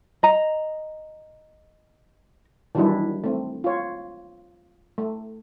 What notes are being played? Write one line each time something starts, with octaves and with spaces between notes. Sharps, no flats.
D#5 A#5
D#3 E3 F#3 G3 D4 E4
A3 C4
F4 C#5
A3